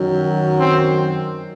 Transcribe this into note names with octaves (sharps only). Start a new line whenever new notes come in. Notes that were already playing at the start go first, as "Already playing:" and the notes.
Already playing: F#2 D#3 F#3
C4